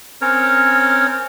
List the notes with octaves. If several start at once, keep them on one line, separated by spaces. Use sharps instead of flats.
C4 C#4 A#4 C#5